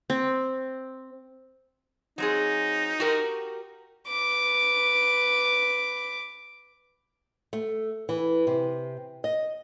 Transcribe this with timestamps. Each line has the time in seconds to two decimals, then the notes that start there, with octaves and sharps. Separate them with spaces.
0.10 C4
2.18 F#3 C4 D#4 G#4
3.00 F#4 G4 A#4
4.08 B4 D6
7.53 A3
8.09 E3
8.47 C3
9.24 D#5